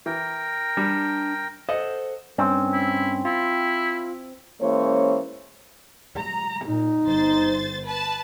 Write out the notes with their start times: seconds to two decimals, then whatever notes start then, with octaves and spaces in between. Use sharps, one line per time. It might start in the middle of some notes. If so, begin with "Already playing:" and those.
0.06 E3 A#4 G5
0.77 G3 D4
1.69 A4 C5 D#5 F#5
2.38 G2 C4 C#4
2.73 E4
3.25 E4 F4
4.61 E3 G#3 A#3 C#4 C5 C#5
6.18 A#5
6.65 A#2 D#4
7.05 G1 C5 A6
7.84 B4 A5